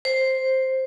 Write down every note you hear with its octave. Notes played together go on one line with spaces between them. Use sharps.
C5